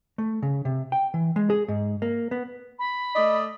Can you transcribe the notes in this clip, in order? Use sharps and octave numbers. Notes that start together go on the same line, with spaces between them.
A3
C#3
C3
G5
E3
G#3
G#4
G#2
A#3
B3
B5
A3 D5 D#5